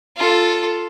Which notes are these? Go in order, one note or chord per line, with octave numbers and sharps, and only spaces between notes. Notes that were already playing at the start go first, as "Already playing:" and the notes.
F4 A4